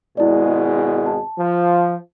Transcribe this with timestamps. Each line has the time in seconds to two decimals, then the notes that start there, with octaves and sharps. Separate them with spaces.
0.17 G#1 B2 G#3 E4 D5
1.06 A5
1.38 F3